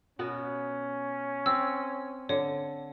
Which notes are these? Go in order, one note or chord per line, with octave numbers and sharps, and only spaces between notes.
B2 B3 C#4 A#4
C4 E6
D3 C#5